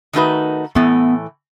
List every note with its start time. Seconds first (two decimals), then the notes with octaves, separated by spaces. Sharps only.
0.13 D#3 A3 D#4 F#4 B4
0.75 A2 E3 A3 B3